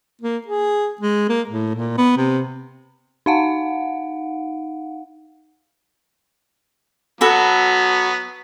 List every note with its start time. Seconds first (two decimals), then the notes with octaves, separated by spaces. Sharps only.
0.21 A#3
0.47 G#4
1.01 G#3
1.29 A#3
1.49 A2
1.74 A#2
1.98 B3
2.17 C3
3.26 D#4 F5 F#5
7.21 F#3 B3 F#4 A4 B5